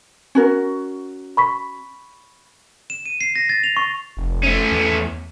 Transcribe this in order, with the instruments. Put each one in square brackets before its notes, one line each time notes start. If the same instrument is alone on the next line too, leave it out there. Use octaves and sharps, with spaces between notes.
[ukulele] C#4 F#4 A#4
[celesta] B5 C#6 B6
[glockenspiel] E7
D#7
C7
A#6
A6
F7
C#6
[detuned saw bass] F1
[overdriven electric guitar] A3 C#4
[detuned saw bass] E2